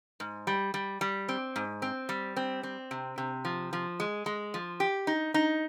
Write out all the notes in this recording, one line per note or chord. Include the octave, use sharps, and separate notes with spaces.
G#2
G3
G3
G3
C4
G#2
C4
G3
C4
C4
C3
C3
F3
F3
G#3
G#3
F3
G4
D#4
D#4